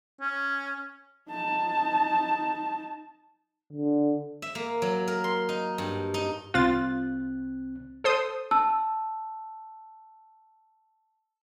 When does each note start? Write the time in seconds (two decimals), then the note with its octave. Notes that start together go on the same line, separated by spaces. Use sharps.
0.21 C#4
1.30 D#4 A5
3.73 D3
4.42 E5
4.55 A#3
4.82 F#3
5.08 A#4
5.24 C6
5.49 D#4
5.78 G2
6.14 D#4
6.54 C2 C4 F4 F#6 A6
8.04 A4 C5 D#6
8.51 A5 E6